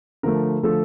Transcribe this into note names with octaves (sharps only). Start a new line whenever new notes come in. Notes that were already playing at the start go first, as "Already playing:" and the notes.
D3 F3 A3 A#4
D3 F3 A3 A4